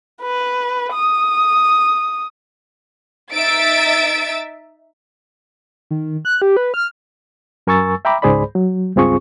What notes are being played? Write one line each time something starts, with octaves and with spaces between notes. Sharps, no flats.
B4
D#6
D#4 E5 E6 A6 D7
D#3
F#6
G4
B4
F6
F#2 A#4 G#5 C#6 E6 A6
E5 G5 A#5 B5 D6
C#2 G#2 G#4 C5 D5 B5
F#3
C#2 G2 C4 F4 G#4 C#6